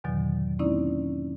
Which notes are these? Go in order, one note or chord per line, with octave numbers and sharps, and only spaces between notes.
E2 G#2 B2 D3 D#3 F#3
A#3 C4 C#4 D#4 E4 D5